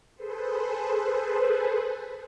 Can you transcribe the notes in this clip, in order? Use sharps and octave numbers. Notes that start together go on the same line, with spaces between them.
G#4 A4 B4 C5